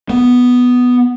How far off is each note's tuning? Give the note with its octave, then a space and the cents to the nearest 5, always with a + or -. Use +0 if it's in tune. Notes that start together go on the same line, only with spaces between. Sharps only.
B3 +0